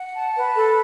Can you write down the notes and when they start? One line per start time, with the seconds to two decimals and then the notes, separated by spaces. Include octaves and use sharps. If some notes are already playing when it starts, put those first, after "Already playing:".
Already playing: F#5
0.14 A5
0.36 B4
0.56 A4